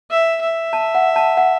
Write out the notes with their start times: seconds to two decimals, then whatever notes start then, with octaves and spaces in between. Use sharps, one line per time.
0.10 E5
0.41 E5
0.73 A5
0.95 F#5
1.16 A5
1.37 F#5